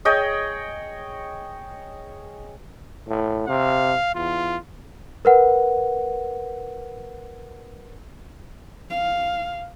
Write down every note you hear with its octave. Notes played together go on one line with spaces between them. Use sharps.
G#4 C#5 D#5 G5
A2
C3 F5
E2 F4
A#4 B4 F#5
F5